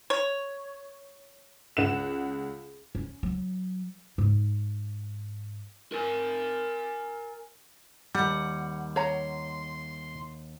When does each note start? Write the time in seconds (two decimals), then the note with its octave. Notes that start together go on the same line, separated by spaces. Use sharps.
0.10 C#5
1.77 C#2 F#5 E7
2.95 C#4
3.23 F#3
4.18 G#2
5.92 A#4 G#5
8.15 D#2 G3 F#5
8.96 C#5 A#5 C6